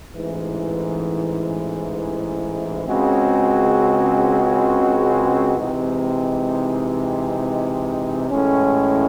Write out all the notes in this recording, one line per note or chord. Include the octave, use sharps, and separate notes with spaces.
A1 G#2 E3
C#2 C#3 G#3 C4 F#4
C3 E3 G#3 C4 D#4
A1 A2 G#3 C#4